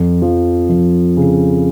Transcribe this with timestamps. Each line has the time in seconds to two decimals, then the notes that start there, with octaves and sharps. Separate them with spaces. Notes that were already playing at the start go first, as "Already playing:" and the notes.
Already playing: F2
0.22 F3
0.69 F2
1.17 C#3